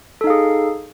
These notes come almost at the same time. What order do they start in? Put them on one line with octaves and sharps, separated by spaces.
A4 D#4 F5 G#4